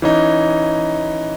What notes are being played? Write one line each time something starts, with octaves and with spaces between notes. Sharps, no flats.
E3 C#4 D#4